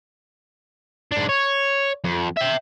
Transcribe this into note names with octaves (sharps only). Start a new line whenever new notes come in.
G#2 D4
C#5
F2
E5 G5